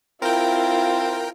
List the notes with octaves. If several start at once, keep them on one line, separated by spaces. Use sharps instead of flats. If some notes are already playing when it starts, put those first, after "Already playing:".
C4 E4 F4 A#4 G5